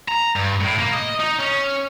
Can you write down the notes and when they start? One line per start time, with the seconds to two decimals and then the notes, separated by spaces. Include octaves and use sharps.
0.08 A#5
0.36 G2
0.61 A2
0.79 A#3
0.93 D#5
1.20 D#4
1.40 C#4